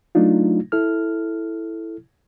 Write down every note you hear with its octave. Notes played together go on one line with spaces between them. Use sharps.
F#3 A3 D4 D#4 F4
E4 A4 F6